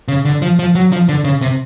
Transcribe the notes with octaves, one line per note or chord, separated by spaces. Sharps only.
C#3
D3
F3
F3
F#3
F3
D3
C#3
C3